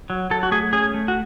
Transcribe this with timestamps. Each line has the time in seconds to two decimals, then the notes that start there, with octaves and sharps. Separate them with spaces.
0.10 F#3
0.30 F#3 A4
0.43 F#4
0.51 A3 G#4
0.73 C#4 G#4
0.94 A3
1.08 F#4